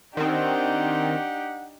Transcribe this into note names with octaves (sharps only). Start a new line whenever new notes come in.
D#3 C4 D4 D#4 G4 F#5